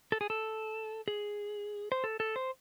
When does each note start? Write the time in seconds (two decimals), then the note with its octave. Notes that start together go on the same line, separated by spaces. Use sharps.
0.12 A4
0.21 G#4
0.30 A4
1.08 G#4
1.92 C5
2.04 A4
2.20 A4
2.36 C5